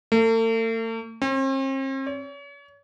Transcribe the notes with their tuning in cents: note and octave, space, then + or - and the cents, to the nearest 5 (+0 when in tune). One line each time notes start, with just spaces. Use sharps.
A3 +45
C4 +45
C#5 +35